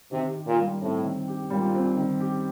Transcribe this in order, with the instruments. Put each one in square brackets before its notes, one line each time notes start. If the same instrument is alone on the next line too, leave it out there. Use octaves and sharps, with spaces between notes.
[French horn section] C3 [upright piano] D#3
[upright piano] G4
[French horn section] A#2
[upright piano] G3
[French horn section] A2 [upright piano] C4
[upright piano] D#3
G4
[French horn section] A#2 [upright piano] G3
[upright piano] C4
D#3
G4